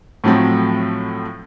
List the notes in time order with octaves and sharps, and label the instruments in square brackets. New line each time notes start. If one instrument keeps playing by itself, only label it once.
[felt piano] A2 F3 F#3 A3 C4